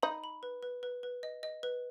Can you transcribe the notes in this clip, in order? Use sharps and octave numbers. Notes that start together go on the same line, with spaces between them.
D#4 B5
B5
B4
B4
B4
B4
D#5
D#5
B4